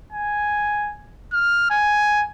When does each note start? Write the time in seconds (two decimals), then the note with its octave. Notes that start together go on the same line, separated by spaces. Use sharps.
0.12 G#5
1.33 F6
1.70 G#5